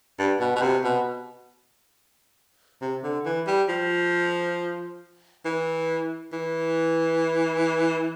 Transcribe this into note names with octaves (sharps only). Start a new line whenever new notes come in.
G2
B2
B2
C3
B2
C3
D3
E3
G3
F3
E3
E3